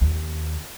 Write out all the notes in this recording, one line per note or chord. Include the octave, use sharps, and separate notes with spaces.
D#2